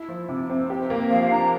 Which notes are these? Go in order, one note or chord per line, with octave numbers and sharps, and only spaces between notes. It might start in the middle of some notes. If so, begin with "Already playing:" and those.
Already playing: E4
F3
C3
C4
G4
A#3
F3 F5
D4 A#5